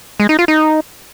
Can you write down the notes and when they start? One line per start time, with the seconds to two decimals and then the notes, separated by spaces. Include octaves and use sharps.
0.20 G#3
0.29 D#4
0.39 F4
0.48 D#4